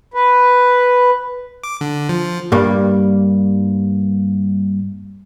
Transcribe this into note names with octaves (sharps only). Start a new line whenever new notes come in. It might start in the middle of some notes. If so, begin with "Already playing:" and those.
B4
D6
D3
F3
G2 G3 A#3